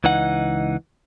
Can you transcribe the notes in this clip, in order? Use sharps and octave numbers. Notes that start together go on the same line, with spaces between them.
C#2 E3 D#4 F#5